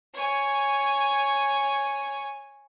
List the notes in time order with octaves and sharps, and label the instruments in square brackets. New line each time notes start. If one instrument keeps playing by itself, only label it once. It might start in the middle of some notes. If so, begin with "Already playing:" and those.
[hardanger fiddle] C#5 G#5